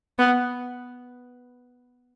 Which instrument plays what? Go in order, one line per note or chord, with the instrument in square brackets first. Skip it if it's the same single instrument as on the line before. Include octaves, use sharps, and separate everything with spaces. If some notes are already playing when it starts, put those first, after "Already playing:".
[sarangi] B3